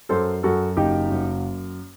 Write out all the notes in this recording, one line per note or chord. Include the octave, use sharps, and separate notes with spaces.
F#2 A4 C5
F#2 F#4 A4
F#1 D#4 G4
F#2